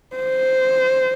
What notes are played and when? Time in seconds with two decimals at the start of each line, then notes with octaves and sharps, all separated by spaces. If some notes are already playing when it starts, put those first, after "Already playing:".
0.16 C5